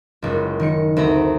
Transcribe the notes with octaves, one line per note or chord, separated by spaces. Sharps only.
F#1 C#2
D#3 C#7
D2 C4 A#5 B5